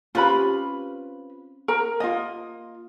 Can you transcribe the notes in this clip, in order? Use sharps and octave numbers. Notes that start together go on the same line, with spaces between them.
C4 C#4 F4 G4 B4 B5
A#4 A#5
A#3 F4 D#5